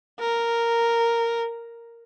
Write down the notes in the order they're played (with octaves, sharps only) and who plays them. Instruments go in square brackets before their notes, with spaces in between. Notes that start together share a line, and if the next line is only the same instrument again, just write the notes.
[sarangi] A#4